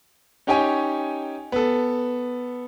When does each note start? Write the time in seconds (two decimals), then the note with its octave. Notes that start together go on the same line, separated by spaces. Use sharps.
0.47 C#4 D#4 G4 C#5 G5 G#5
1.52 B3 A4